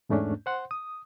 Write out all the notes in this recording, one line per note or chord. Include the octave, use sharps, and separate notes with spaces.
E2 G#2 A3 C#4 D4
C5 F#5 C6
D#6